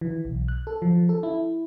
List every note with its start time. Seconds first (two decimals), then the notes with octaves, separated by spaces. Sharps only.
0.01 E3
0.25 B1
0.48 F#6
0.67 A4
0.82 F3
1.09 A4
1.23 E4